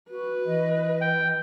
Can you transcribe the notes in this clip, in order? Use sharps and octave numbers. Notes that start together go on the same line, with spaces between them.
F#4 B4
E3 D#5
G5